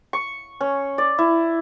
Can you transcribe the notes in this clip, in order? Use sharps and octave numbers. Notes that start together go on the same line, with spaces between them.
C#6
C#4
D5
E4